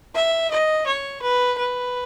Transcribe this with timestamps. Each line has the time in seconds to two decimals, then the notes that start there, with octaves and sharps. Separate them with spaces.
0.15 E5
0.51 D#5
0.86 C#5
1.22 B4
1.58 B4